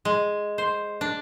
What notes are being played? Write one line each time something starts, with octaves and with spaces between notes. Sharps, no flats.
G#3
C5
D4